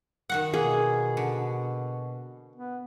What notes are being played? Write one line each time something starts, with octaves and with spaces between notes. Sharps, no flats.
D#3 F#4 F#5
B2 A#3 G#4
D3
B3